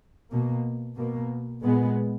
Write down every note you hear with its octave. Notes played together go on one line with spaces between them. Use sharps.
B2 A#3
B2 A#3
A#2 G#3 B3